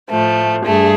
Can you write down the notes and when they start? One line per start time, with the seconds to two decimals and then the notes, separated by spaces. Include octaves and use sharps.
0.10 A2 F3 A3
0.66 G2 A3 G#4